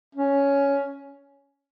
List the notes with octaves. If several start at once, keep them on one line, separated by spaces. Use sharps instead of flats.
C#4